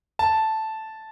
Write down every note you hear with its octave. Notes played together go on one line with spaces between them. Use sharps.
A5